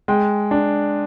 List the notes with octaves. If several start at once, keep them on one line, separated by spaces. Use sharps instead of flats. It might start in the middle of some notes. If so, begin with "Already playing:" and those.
G#3 G5
D4